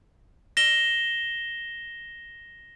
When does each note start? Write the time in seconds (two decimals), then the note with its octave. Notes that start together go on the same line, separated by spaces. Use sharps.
0.57 A#6 E7 G7